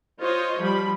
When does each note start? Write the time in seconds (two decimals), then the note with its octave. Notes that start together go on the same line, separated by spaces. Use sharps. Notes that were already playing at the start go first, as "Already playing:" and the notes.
0.20 F4 C5 C#5 D#5
0.60 F3 G3 B5